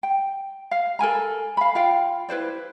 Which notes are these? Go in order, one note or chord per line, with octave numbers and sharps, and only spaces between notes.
G5
F5
A4 A#4 G#5 A#5
F5 B5
F4 F5 G5
E4 B4 C5 D5